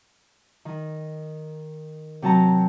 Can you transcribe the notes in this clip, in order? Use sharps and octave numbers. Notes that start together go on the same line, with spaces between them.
D#3
C3 F#3 A5 A#5